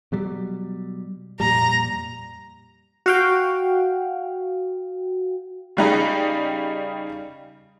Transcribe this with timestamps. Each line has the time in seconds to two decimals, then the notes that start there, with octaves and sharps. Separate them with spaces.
0.12 B2 F#3 G3
1.40 F2 A#2 G3 A#5
3.06 F#4 F5 G5
5.77 C#3 G3 D#4 G#4